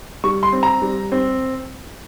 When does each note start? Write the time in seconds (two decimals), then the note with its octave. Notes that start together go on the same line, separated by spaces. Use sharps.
0.24 G3 C#6
0.43 C6
0.53 C4
0.63 A#5
0.82 G3
1.12 C4